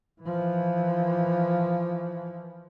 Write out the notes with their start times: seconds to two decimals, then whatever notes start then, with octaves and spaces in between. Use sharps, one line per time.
0.22 E3 F3